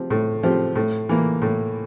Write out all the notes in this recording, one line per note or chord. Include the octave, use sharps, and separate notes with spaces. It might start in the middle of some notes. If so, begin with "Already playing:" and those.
Already playing: F3 C4 G4
A2
F3 C4 G4
A2
E3 A#3
A2